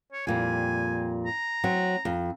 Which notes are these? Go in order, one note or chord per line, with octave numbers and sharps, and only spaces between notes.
C#5
F2 A#2 G3 G#5
A#5
F#3 C4
F2